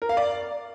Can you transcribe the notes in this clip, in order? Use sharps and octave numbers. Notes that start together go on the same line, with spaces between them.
A#4
F5
D5